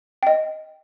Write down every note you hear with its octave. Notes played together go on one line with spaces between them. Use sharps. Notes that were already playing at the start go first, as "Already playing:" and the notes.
D#5 G5